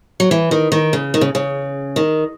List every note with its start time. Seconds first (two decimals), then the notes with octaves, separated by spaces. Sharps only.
0.20 F#3
0.31 E3
0.51 D#3
0.72 D#3
0.93 C#3
1.14 D#3
1.21 C#3
1.35 C#3
1.96 D#3